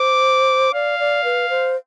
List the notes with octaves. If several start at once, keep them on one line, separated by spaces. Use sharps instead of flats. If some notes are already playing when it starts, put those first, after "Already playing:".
Already playing: C5 D6
D5 F5
D5
B4
C5